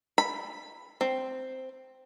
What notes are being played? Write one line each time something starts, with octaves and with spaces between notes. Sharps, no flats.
B5
C4